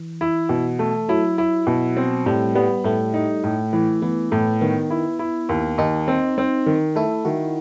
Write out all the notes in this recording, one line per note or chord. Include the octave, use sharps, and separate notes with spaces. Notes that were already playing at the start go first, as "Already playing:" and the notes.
Already playing: E3
E4
B2
A3
F#3 E4
E4
B2
C4
A2 G3
G3 B3
A2 A3
D#4
A2
E3
E3 B3
A2 A3
D#3 B3
E4
E4
D#2
D#2 D#4
C4
C4
D#3
A3 E4
D#3 F#4